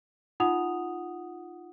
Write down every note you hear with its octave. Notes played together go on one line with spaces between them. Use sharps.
D#4 F4 F#5 D#6 F7